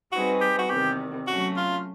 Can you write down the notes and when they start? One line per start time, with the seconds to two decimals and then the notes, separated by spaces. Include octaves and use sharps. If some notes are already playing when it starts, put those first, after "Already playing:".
0.12 G3 C4 D#4 F#4 G#4 B4
0.41 G4
0.59 F#4
0.70 E2 C3 D#3 G4
1.27 F#3 A3 C#4 F#4
1.57 F4